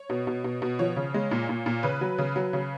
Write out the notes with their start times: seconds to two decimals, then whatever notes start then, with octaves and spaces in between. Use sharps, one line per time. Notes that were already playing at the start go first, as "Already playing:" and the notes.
Already playing: C#5
0.10 B2
0.27 B2
0.44 B2
0.62 B2
0.79 F3 C#5
0.96 C#3
1.14 G#3
1.31 A#2
1.49 A#2
1.66 A#2
1.83 C#3 B4
2.01 F#3
2.18 C#3
2.36 F#3
2.53 C#3